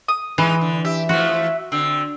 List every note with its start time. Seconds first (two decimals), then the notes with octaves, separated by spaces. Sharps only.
0.08 D#6
0.38 E3 G#3 D#4
0.61 D3
0.85 G4 E5
1.09 E3 F3 A3 F#4
1.72 D3 C4